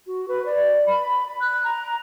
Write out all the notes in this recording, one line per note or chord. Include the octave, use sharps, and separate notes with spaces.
F#4
B4
D5
B5
F#6
A#5